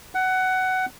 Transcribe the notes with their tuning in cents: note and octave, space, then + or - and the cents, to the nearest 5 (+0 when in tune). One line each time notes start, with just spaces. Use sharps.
F#5 +15